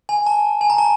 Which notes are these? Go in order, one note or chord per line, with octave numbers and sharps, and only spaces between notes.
G#5
A5
G#5
A#5
A5